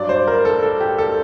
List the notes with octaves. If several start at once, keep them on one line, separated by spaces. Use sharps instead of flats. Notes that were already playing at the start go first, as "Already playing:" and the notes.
Already playing: G2 F#3 D5
C5
A#4
A4
A4
G4
A4